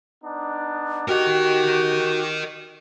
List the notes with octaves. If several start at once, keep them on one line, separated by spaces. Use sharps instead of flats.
B3 D4 D#4
F#4 G4 A#4 D#5